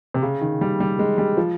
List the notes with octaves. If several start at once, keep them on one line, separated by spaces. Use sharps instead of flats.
C3
C#3
D#3
G3
G3
G#3
G3
F3